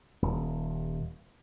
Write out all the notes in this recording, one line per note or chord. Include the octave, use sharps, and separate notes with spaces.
D#1